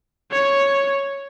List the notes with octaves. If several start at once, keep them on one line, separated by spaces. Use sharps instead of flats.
C#5